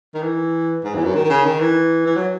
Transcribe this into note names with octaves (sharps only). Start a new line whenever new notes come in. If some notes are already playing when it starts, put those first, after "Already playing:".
D#3
E3
G#2
E2
F#2
D#3
D#3
C#3
D#3
E3
E3
F#3